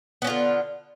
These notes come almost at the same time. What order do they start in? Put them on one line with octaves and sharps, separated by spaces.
B3 C#4 F4 D3